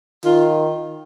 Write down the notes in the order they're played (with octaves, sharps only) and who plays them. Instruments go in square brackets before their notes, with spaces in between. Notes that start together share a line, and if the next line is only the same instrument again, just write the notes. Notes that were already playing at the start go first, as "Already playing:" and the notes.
[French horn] D#3 [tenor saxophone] F4